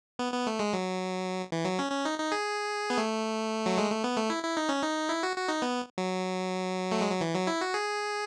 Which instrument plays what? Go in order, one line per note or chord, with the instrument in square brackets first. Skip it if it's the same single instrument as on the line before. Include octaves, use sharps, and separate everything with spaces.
[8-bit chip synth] B3
B3
A3
G#3
F#3
E3
F#3
C#4
C#4
D#4
D#4
G#4
B3
A3
F#3
G#3
A3
B3
A3
E4
E4
D#4
C#4
D#4
E4
F#4
F#4
D#4
B3
F#3
A3
G#3
F#3
E3
F#3
E4
F#4
G#4